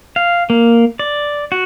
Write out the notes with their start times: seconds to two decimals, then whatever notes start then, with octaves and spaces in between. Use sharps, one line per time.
0.16 F5
0.50 A#3
0.99 D5
1.52 F#4